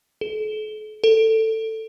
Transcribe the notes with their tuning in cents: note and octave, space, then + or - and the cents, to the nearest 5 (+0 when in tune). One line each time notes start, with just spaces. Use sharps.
A4 -45
A4 +15